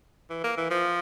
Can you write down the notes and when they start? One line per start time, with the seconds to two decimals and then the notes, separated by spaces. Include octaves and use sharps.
0.30 E3
0.44 A#3
0.57 E3
0.70 F3